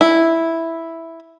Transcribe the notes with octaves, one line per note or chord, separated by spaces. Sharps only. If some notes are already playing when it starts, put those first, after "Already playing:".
E4